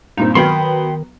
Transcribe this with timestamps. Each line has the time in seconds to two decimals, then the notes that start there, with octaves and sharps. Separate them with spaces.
0.17 G2 A#2 C4 D#4
0.35 D#3 F#3 B3 G5 B5 C6